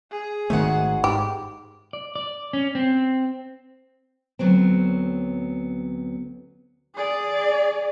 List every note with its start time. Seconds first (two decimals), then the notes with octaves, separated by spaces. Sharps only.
0.11 G#4
0.50 G#1 G#2 D#3 A3 F#4 F#5
1.04 G#2 G4
1.93 D5
2.16 D5
2.53 C#4
2.75 C4
4.39 D2 F#3 B3 C4
6.95 G#4 D5